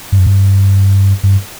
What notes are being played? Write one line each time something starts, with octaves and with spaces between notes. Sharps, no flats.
G2
F#2
G2
G2